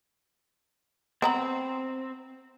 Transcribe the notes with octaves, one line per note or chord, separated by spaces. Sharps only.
B3 C4 A#5 B5